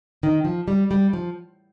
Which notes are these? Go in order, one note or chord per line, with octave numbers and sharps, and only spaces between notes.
D#3
F3
G3
G3
F3